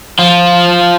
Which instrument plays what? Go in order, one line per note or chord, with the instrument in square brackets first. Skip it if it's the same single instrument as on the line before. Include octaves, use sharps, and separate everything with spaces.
[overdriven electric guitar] F3 F4